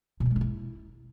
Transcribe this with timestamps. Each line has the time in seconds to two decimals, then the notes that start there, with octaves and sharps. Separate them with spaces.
0.20 B2
0.25 G3
0.31 G#3
0.36 D4
0.41 E4